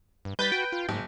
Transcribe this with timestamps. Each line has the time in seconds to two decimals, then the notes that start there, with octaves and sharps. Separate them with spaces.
0.25 G2
0.39 G3 B4 G6 A6 B6
0.52 F#4 G5
0.72 F4
0.89 F#1 G#2